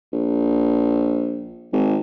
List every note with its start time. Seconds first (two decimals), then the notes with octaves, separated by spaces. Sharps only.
0.13 A#1
1.73 G#1